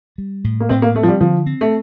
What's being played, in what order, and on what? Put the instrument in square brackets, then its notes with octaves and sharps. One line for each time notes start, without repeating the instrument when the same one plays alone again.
[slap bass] G3
A2
[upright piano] A#3
[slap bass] A2 [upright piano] C4
[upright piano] A#3
[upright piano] A3 [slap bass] C4
[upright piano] F3
G3
[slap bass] D3 [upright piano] F3
[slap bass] C4
[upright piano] A3